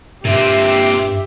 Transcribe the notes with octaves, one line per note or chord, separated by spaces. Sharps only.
G2 A#2 C4 G4 E5